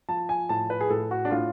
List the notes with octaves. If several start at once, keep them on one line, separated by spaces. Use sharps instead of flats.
F3 A5
G#5
A2 A5
B4
G#4
A2 A4
F#4
D4
A2 F4